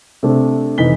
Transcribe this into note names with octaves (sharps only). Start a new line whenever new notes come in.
C3 A3 D4
F1 E3 D#4 B6 G7